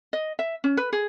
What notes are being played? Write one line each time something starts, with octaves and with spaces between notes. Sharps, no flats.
D#5
E5
C#4
B4
G#4